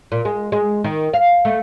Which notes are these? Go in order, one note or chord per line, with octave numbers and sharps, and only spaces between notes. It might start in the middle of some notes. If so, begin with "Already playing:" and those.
A#2
G#3
G#3
D#3
F5
A3